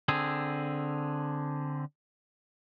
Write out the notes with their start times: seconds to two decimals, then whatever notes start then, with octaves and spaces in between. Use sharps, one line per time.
0.08 D3 C4 G#4